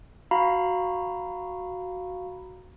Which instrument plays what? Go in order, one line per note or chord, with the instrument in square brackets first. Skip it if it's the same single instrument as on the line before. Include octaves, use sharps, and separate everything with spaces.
[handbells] F#4 F5 A#5 B5